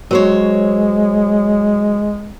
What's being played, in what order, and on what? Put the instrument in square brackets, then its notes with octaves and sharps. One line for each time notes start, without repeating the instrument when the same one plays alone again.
[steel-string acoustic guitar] F#3 C5 C#5 [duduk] G#3